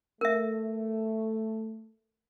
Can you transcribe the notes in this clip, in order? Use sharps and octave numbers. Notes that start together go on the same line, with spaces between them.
A3 A#4 E5